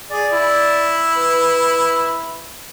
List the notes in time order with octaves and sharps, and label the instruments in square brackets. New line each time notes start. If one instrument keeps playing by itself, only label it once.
[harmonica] G#4 [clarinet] D5
[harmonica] E4
[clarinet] B4